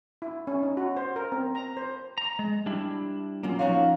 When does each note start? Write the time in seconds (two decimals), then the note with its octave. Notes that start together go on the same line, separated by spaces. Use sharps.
0.22 E4
0.47 C#4
0.63 D#4
0.77 F#4
0.97 C5
1.16 A#4
1.32 C4
1.55 A#5
1.77 C5
2.18 A#5
2.39 G#3
2.66 G3 D4 E4
3.43 F#3 A#3 C#4 F4
3.59 F3 C#4 D#4 F#4 C#5 F5